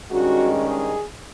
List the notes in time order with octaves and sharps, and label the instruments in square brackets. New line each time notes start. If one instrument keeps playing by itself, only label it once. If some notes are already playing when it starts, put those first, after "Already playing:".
[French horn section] G2 D#3 G#3 C#4 F#4
G#4